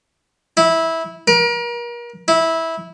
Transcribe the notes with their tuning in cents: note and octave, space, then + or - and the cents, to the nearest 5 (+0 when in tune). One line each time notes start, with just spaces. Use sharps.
E4 -15
A#4 +35
E4 -15